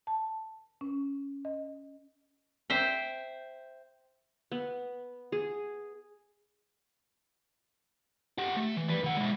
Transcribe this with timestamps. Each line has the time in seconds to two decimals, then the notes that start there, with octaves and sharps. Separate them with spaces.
0.07 A5
0.81 C#4
1.45 D#5
2.70 C5 E5 G5
4.52 B3
5.32 G#4
8.38 G4 F#5
8.57 A3
8.76 E3
8.88 G3 B4
9.04 D#3 F#5
9.17 G#3 E4